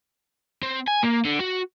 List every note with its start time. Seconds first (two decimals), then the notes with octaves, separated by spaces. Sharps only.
0.63 C4
0.88 G#5
1.03 A#3
1.25 D3
1.40 F#4